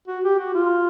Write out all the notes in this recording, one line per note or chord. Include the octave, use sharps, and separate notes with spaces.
F#4
G4
F#4
F4